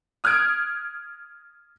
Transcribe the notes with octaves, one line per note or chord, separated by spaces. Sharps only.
D#6 F6 F#6 G#6 D7